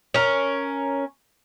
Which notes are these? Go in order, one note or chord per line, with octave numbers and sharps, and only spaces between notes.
C#4 A#4